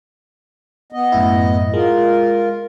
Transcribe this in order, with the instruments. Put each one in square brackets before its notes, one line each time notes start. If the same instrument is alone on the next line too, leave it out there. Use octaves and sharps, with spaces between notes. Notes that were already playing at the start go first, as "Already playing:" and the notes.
[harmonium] B3 D#5
[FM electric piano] F#2 A2 E4
[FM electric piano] G#3 [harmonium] F4 A#4